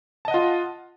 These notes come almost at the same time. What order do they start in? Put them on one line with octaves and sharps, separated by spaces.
A5 D#5 F#5 F4